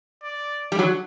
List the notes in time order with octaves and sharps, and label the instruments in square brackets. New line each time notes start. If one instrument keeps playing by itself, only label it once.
[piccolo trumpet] D5
[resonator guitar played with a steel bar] G3
F#3